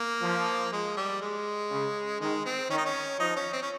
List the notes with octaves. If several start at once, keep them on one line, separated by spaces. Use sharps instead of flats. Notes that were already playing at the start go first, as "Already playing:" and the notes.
Already playing: A#3
F3
G#3
G3
G#3
C#3
D#3 G#3
C4
D#3 C#4
D#4
C#4
F3 D#4
C#4
C4
C#4